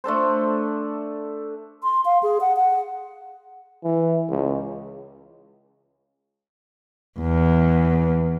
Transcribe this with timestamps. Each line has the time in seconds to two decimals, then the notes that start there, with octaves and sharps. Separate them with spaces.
0.04 A3 D4 A4 C5
1.83 C6
2.05 F5
2.23 G#4
2.41 F#5
2.57 F#5
3.84 E3
4.29 C#2
7.20 E2